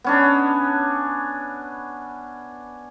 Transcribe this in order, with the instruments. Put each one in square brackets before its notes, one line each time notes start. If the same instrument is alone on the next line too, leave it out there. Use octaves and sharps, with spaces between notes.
[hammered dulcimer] B3 C#4 D4